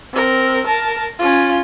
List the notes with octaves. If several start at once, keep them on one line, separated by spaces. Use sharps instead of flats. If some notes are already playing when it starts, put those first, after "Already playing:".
C4 A#4
A#4 A5
C#4 F4